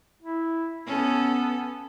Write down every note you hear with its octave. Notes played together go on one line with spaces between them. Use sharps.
E4
B3 C#4 A4